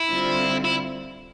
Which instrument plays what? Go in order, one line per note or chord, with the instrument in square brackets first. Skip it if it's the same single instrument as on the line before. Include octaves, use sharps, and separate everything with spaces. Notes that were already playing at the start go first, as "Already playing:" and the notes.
Already playing: [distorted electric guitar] E4
[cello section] D3 G3 C4 F4
[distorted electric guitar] E4